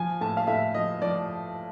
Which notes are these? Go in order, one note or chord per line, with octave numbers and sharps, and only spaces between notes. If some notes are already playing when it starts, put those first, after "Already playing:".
Already playing: F3 G#5
A2 A5
F5
A2 E5
F3 D#5
F3 D5